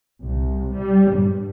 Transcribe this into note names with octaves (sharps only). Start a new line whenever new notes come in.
C2
G3
G2